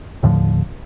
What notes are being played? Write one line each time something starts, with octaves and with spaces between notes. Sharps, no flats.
D#2 A2 D3 F3